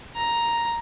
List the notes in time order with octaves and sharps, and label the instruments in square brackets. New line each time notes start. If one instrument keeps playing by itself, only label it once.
[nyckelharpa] A#5